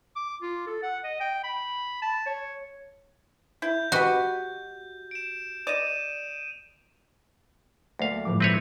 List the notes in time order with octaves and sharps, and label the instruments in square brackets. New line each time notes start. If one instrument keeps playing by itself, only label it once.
[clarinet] D6
F4
A4
F#5
D#5
G5
B5
A5
C#5
[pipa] E4 [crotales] G6
[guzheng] F#4 [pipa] G4 B4 D#5
[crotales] D7 E7
[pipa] D5 D#5 [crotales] D#6 D#7 E7
[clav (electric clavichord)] D2 F5 [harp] A3 A#3
[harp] G1 A2 [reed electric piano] F3 G#3 D6
[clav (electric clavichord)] C4 B4 C#5